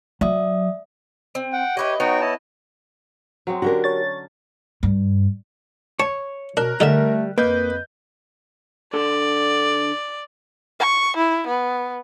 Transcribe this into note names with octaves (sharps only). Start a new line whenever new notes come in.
F#3 D5 E5 D#6
C4
F#5 G5
E4 G4 B4 C#5 D#5
B3 D#4 F#4 C#5 G5 G#5
E4 D#5 A5
F#3 G#3 C4
D3 C#4 D4 F#4 G4 A#4
C#5 A6
G2
C#5 A5
B2 D4 A#4 F#6
D3 G3 A3 D#4 E5
F2 A#3 B4 D#5 G6
D3 A4 D5 C6
C#6
E4
B3